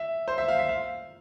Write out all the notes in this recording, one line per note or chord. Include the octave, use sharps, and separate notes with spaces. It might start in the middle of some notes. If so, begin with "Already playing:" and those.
Already playing: E5
C5
E5
F5
E5
F5